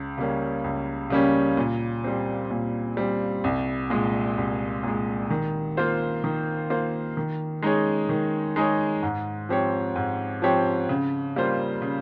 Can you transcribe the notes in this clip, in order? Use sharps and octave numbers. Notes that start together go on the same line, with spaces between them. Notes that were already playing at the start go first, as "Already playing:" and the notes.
Already playing: C#2
C#3 G3 A#3 C#4
C#2
C#3 G3 A#3 C#4
A#2
G3 C4
A#2
G3 C4
C2
A#2 G#3
C2
A#2 G#3
D#3
A#3 F4 C5
D#3
A#3 F4 C5
D#3
G#3 D#4 G#4 C#5
D#3
G#3 D#4 G#4 C#5
G#2
F3 C4 G4 C#5
G#2
F3 C4 G4 C#5
C#3
G3 A#3 F4 C5
C#3